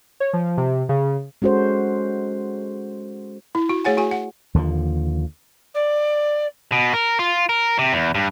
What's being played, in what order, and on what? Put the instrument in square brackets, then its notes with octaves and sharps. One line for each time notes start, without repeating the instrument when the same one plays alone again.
[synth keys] C#5
F3
C3
C#3
[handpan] G#3 C#4 F#4 A4 C5
[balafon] E4
F#4
A3 G#4 C#5 F#5 G#5
F#4 G#4 G#5
F#5
[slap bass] D#2 D3 D#3 F3
[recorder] D5
[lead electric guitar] B2
A#4
F4
A#4
C3
E2
G2